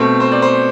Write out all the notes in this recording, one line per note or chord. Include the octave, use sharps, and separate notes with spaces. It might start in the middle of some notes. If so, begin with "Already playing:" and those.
Already playing: B2 A3 C4
C5
D5
C5